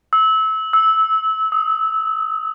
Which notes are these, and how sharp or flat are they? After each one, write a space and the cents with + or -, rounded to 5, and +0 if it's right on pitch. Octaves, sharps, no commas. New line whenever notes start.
E6 -25
E6 -15
D#6 +15